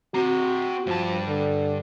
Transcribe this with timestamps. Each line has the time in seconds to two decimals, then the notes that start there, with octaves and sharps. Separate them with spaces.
0.15 C4 F#4 A#5
0.87 G2 F3 A5
1.27 D3